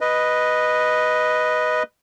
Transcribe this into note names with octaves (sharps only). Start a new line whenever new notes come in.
B4 D#5